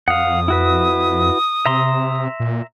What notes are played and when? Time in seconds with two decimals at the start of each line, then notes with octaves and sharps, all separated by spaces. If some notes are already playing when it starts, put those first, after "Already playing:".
0.08 F2 F5 F#5 D#6
0.48 E4 F#4 B4
1.66 C3 E5 A#5 C6
2.40 A#2